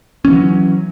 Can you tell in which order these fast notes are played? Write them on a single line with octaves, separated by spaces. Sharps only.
C#4 D#3 E3 F#3